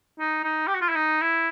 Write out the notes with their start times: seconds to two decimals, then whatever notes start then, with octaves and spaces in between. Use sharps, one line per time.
0.19 D#4
0.44 D#4
0.67 G4
0.74 F#4
0.81 F4
0.89 E4
0.96 D#4
1.22 E4